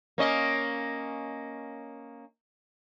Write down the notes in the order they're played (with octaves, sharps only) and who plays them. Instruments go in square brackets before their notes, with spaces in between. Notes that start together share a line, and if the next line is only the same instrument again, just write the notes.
[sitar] A#3 C#4 D#5